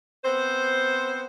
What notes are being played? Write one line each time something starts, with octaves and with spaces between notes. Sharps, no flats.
B3 C4 C5